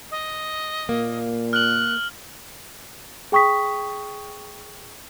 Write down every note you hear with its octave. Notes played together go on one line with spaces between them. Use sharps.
D#5
A#2 A#3
F6 F#6 F#7
G#4 G5 C#6 D#6 B6